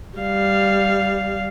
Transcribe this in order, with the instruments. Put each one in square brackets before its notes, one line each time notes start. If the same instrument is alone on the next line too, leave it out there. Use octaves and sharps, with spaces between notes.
[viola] G3 F5